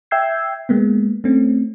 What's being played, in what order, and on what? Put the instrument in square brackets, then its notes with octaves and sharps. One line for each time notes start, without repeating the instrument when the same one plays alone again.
[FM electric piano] E5 G5 E6 G6 G#6 C7
G#3 A#3 B3
A3 C4 C#4